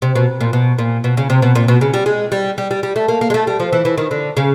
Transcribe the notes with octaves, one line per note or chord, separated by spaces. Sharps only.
C3
B2
A#2
B2
A#2
B2
C#3
C3
B2
A#2
B2
C#3
G3
G#3
G3
G3
G3
G3
A3
A#3
A#3
G#3
A3
G3
F3
E3
E3
D#3
D3
C#3